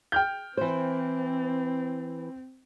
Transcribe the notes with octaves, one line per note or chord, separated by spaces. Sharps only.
G5 F6 G6
E3 C4 C5